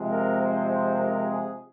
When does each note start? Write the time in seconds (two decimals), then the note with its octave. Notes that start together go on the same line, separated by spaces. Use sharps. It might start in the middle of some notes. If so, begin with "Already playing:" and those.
Already playing: C3 F3 G#3 C4
0.12 A#4
0.41 C5
0.69 C5
0.97 A#4
1.25 G#4